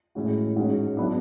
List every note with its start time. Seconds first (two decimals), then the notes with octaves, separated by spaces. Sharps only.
0.15 A2 E3 G#3 C#4 F#4
0.56 G#2 G#3 C#4 F#4
0.97 F#3 B3 D4